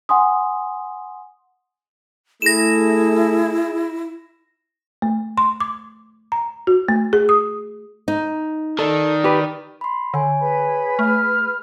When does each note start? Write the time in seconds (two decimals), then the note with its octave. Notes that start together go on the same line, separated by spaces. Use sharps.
0.09 F#5 G#5 C6 D#6
2.42 A3 E4 G#4 A#6 E7
5.02 A3
5.38 C6
5.60 D6
6.32 A#5
6.67 F#4
6.88 A3
7.13 G#4
7.29 D#6
8.08 D#4
8.79 D#3 A4 D5
9.24 G4 B4
9.81 B5 C6
10.14 D3 C#5 G#5
10.39 G#4 B4 B5
10.99 A3 F6